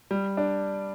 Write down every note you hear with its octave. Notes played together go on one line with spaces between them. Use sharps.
G3
D4